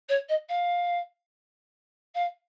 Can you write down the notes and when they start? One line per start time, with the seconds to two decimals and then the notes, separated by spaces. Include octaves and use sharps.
0.09 C#5
0.29 D#5
0.49 F5
2.15 F5